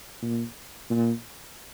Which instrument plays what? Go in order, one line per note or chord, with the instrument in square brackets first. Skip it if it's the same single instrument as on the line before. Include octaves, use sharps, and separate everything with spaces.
[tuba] A#2
A#2